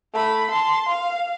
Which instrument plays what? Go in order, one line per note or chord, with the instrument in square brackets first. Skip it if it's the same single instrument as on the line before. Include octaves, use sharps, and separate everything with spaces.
[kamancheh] A3 B5
A5 C6
F5